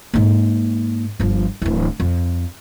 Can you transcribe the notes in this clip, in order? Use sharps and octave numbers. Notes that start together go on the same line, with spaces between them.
G#2 A#3
G1 F3
D1 E3
F2